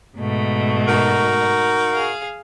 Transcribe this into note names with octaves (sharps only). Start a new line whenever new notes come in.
G#2 B2 A3
D#4 F#4 A#4
G#4 F5